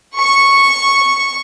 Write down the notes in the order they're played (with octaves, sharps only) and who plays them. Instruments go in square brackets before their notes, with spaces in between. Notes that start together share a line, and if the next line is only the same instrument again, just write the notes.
[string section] C#6